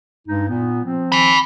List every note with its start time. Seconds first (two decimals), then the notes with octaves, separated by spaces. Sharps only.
0.28 G2 G#3 D#4
0.49 A#2 B3
0.85 F3 C4
1.12 G#5 B5